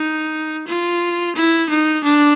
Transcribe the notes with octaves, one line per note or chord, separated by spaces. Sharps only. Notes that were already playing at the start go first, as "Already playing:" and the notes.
Already playing: D#4
F4
E4
D#4
D4